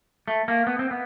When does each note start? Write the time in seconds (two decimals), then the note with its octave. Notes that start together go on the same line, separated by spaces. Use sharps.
0.28 A3
0.48 A#3
0.67 B3
0.79 C4
0.91 B3